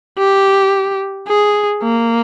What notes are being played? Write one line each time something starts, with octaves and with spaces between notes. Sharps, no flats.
G4
G#4
A#3